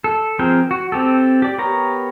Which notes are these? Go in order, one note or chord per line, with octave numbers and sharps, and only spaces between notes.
A4
F3 C4 G#4 A#4 G5
F#4
C4 G4 A4
G4 D5
B3 G4 A#4 C#5 A#5